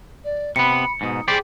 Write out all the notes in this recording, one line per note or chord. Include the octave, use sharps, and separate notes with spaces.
D5
C3 B3 B5 C#7
G#2 B2 D#4
G4 G#4 C5 D5